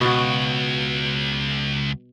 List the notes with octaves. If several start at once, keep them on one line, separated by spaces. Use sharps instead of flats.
C#2 B2 F#4